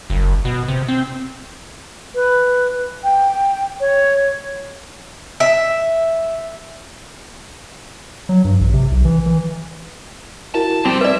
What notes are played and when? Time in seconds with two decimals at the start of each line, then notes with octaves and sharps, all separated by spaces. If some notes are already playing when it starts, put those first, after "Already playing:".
0.10 F#1
0.45 B2
0.68 C3
0.88 C4
2.15 B4
3.04 G5
3.80 C#5
5.40 E5
8.29 F#3
8.45 G2
8.60 A1
8.74 C3
8.91 B1
9.05 E3
9.26 E3
10.54 E4 F#4 A#4 A5
10.85 G3 C4 G4 C5
11.01 B4 D5 E5